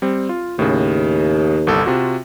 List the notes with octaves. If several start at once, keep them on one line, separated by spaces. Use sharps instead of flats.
G3 C4
F4
D#2 A2 C#3
G1 C2 A4
C3 F4 F#4